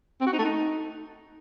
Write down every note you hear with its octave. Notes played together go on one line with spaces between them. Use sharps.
C4
F#4
D#4
A3
D#4